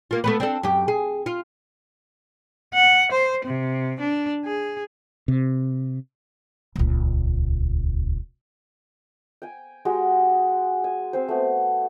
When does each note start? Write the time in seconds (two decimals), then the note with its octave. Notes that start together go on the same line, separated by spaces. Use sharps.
0.11 A#3 F4
0.24 A3 B3 B4
0.40 C4 D4 A4
0.63 F#2 G4
0.88 G#4
1.26 F4
2.74 F#5
3.12 C5
3.45 C3
3.99 D4
4.45 G#4
5.28 C3
6.76 D#1 C#2
9.42 G5 G#5
9.85 G#3 F#4 G4
10.84 G#5
11.13 C4 C5
11.28 A3 B3